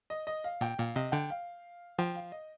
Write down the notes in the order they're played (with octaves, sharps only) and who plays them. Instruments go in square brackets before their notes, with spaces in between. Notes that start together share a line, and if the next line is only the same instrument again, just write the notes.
[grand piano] D#5
D#5
F5
[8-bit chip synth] A#2 [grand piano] G5
[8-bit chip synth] A#2 [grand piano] F5
[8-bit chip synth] C3 [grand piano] D#5
[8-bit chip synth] D3 [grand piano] G5
[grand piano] F5
[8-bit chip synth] F3 [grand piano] G5
[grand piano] F5
D#5